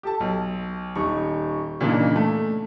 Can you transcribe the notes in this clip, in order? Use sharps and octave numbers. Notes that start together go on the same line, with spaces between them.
G4 A4 A5
B1
D#1 D#4 C#6
A#2 C#3 E3 A#3 D4 D#4
A3